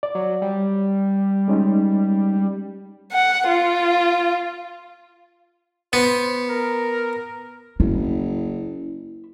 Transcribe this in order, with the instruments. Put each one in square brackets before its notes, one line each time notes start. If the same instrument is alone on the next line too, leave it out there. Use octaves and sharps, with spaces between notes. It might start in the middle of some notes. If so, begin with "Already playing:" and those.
[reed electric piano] D5
[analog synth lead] F#3
G3
[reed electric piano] G#3 C#4 D#4
[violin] F#5
F4
[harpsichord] B3 [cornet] C5
[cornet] A#4
[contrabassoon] F#1 [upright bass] E4